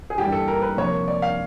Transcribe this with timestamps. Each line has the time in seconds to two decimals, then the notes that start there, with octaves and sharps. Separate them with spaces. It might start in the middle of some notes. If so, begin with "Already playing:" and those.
0.10 G#4
0.18 G2 E3 G3 G4
0.32 A4
0.48 A#4
0.62 B4
0.77 C3 F3 A#3 C#5
1.08 D5
1.22 F5